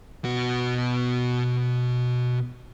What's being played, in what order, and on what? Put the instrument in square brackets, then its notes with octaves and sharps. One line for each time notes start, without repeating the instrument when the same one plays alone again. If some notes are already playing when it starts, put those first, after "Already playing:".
[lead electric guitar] B2 F#4